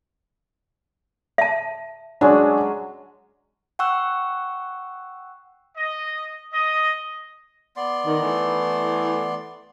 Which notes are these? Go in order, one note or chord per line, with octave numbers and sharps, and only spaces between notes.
E5 A5
F#3 G#3 C#4 D4
F#5 G5 C#6 E6 F#6
D#5
D#5
B3 D5 C6
D#3
E3 A3